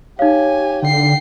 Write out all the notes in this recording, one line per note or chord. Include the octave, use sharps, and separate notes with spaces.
D#4 G4 C#5 F5 G#5
D3 G5 C7